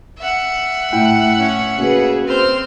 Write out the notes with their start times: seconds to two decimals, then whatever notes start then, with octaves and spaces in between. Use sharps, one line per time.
0.18 E5 F#5
0.93 A2 E4 G5
1.38 C#4
1.78 C#3 A#3 C#4 F#4 G#4 B4
2.28 C4 C5 F6